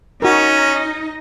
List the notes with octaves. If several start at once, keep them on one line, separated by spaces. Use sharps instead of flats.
C#4 D#4 F#4 A#4 D#5